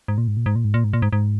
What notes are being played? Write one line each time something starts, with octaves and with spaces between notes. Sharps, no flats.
G#2
A#2
G#2
A#2
G#2
A#2
G#2
A#2
G#2
A#2
G#2
G#2